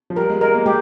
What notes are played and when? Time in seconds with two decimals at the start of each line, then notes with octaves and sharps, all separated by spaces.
0.10 F3
0.16 G3 A#4
0.29 G#3
0.41 G#3 A#4
0.54 A#3
0.66 G#3 G4